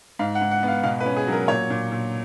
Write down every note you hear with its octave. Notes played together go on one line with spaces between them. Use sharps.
G#2 F5
F#5
G#2
F#5
B3 F5
B2 F5
B4
C#4
G#4
F#3
A#4
A#2 C#5
A#2
A#2